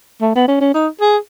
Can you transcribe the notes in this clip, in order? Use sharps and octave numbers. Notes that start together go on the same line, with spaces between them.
A3
B3
C#4
C#4
D#4
G#4